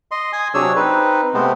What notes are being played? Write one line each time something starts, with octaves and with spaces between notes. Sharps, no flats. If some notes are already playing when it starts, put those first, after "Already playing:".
D#5 C6
G#5 D#6
C3 F#3 D4 G#4 C#5 E6
C4 D#4 B4
C3 G#3 A3 B3 C4